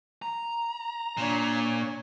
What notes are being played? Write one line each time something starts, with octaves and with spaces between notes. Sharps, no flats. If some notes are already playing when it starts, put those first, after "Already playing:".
A#5
A#2 D4 C#5